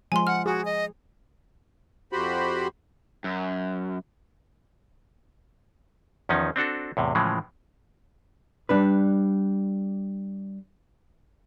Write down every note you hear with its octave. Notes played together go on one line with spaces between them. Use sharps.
F3 G#3 G#5 C6
F#5 F6
F#4 G#4
D#5
F2 F#4 G4 C5 B5
F#2
E2 D#3 F3 C#4 D#4
C4 D4 F#4 A4
E2 A2 C3
A2 C#3 E3 F3 G#3
G3 D4 B4